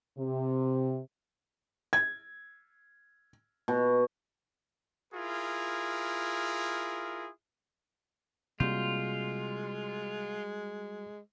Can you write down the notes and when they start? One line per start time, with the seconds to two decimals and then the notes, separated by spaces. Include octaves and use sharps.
0.18 C3
1.93 G#6
3.68 B2
5.13 E4 F4 G#4 A#4
8.60 C3 G3 G#3 A#3 F4 F#4 G6